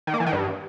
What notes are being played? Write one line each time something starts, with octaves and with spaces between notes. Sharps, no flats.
D#3
A#3
E3
D#3
G2